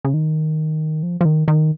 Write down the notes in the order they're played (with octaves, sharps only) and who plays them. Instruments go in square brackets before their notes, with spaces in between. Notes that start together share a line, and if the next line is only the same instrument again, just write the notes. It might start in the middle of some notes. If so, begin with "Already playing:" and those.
[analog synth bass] C#3
D#3
F3
F3
D#3
D#3